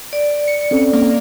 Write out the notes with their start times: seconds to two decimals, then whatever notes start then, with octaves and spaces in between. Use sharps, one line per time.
0.13 D5
0.48 C#7
0.71 C4 C#4 A4
0.93 A#3